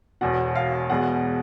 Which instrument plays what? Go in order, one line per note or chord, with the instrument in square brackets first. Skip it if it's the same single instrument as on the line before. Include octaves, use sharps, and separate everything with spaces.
[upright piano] E1 E2 B2 F#5
F5
E2 B2 G#3 B3 F#5